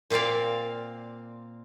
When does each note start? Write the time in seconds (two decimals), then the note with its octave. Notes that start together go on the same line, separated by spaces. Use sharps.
0.10 A#2 A#3 C4 D5 F5